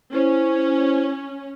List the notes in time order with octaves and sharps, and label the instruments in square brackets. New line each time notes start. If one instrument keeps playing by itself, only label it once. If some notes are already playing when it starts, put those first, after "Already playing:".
[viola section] C#4 [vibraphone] E4 C5